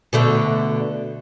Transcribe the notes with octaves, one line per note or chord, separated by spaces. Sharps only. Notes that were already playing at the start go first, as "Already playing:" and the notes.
B2 D3 A3